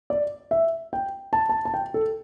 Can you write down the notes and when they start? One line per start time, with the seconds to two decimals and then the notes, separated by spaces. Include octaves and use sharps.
0.10 D5
0.51 E5
0.93 G5
1.33 A5
1.49 A5
1.65 A5
1.74 G5
1.94 A4